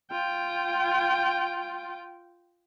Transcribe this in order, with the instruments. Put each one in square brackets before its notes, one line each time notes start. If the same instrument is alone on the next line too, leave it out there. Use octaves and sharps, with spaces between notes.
[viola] F4 G5